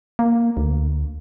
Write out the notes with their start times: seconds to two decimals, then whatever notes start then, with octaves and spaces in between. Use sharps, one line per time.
0.19 A#3
0.57 D2